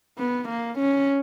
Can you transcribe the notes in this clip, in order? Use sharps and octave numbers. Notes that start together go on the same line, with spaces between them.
B3
A#3
C#4